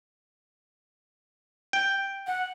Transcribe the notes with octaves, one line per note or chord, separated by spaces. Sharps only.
G5
F#5